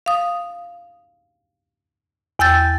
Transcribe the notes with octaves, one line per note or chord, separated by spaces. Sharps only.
F5 D#6
E2 G5 E6 G6 A6